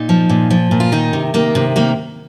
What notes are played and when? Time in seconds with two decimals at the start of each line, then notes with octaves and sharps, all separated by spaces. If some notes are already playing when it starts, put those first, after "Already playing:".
Already playing: A#2 D#4
0.09 F3
0.29 A#2
0.50 F3
0.71 A#2
0.80 F4
0.92 D#3 D#4
1.13 C3
1.34 D#3 A#3
1.55 C3
1.76 D#3 A#3